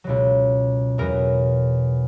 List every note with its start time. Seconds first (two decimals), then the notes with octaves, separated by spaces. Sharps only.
0.04 C#2 B2 F#3
0.98 E2 B2 F#3 A#4